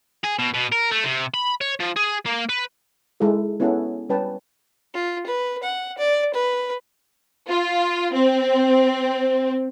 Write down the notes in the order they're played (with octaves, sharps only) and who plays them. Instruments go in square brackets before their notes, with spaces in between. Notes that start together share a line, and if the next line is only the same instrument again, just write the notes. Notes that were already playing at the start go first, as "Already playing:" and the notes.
[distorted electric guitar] G#4
B2
B2
A#4
A3
C3
B5
C#5
F3
G#4
A#3
B4
[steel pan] G#3 D#4 E4 A4
B3 C#4 E4 G#4 A4 F#5
G3 C#4 B4 G5 A5
[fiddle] F4
B4
F#5
D5
B4
[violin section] F4
C4